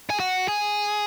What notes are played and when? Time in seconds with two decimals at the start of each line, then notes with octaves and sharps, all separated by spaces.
0.10 G#4
0.20 F#4
0.48 G#4